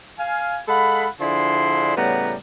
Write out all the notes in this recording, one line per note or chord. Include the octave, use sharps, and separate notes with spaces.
F5 G#5
G#3 A4 F5 F#5 B5
D3 F3 D4 E4 G#4 C6
A2 C#3 G3 B3 F#5 A#5